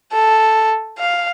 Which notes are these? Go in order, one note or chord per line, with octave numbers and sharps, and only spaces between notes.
A4
F5